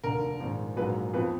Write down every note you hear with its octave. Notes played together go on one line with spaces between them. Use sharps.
F1 D#2 D3 A#4
A#1 G#2 D#3
A#1 G#2 F#3 A#3 B4
F2 F3 B3 B4